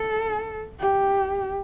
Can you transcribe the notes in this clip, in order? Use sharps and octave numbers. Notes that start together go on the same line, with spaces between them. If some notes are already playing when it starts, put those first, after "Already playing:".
Already playing: A4
G4